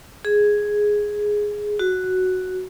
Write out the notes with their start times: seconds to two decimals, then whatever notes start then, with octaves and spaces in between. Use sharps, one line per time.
0.25 G#4
1.79 F#4